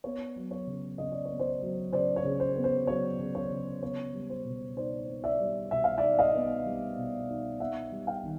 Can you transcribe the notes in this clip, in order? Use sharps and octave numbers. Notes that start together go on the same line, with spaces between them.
B3 C#5
F#3
C#5
C#3
C#3 D#5
D5
B3 C#5
C5 D5
F#3
C#3 C5 D5
C#5
C#3
C5
B3
C5
F#3 C#5
C#3
C#5
C#3
B3 C#5
G3
C5
B2
D#4 C5 D5
B3
D5 E5
G3
B2 E5
F5
D#4 D5 E5
D#5 F5
B3
G3
B2
D#4
B3 E5 F#5
G3
F5 G5
D#3